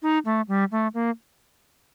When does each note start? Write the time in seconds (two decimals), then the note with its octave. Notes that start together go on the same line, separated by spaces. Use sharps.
0.02 D#4
0.25 A3
0.48 G3
0.72 A3
0.94 A#3